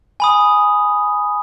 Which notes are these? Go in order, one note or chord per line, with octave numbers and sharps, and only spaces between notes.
G#5 B5 D#6